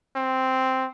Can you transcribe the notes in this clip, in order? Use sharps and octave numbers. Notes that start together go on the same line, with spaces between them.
C4